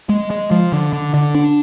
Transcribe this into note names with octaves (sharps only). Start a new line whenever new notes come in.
G#3
G#3
F3
D3
D3
D3
D4